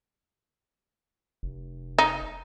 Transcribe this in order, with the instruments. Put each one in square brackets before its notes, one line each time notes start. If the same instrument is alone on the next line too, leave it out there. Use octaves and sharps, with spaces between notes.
[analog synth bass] F1
[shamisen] D#4